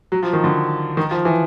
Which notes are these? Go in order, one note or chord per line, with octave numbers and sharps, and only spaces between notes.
F#3
F3
D#3
D3
D#3
F3
E3